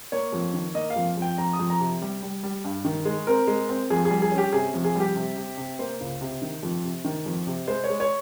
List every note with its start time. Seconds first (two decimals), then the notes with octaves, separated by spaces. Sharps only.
0.12 A#3 C#5
0.32 F2
0.53 D#3
0.74 A#3 D#5
0.90 F5
0.96 F2
1.17 F2 G5
1.38 F2 A#5
1.53 D#6
1.59 F2
1.70 A#5
1.80 C3
2.01 G3
2.23 G3
2.43 G3
2.64 G2
2.85 D#3
3.05 G#3
3.27 C4 A#4
3.47 G#3
3.69 C4
3.90 F2 G#4
4.05 G#4
4.10 G3
4.22 G#4
4.32 C#4
4.38 G4
4.53 C3 G#4
4.74 F2
4.84 G#4
4.95 G3
5.00 G4
5.16 C3
5.36 C3
5.57 C3
5.79 A#3 C5
6.01 C#2
6.21 C3
6.42 D#3
6.63 F2
6.84 C3
7.04 D#3
7.26 F2
7.47 C3
7.67 G#3 C5
7.84 C#5
7.90 G#3
8.00 C#5